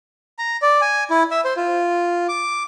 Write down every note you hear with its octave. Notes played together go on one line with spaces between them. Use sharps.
A#5
D5
G#5
E4
E5
C5
F4
D6